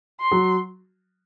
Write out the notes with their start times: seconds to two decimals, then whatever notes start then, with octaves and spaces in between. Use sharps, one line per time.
0.21 C6
0.32 F#3